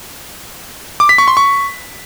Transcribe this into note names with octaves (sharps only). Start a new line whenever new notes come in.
D6
B6
C#6
C6
C#6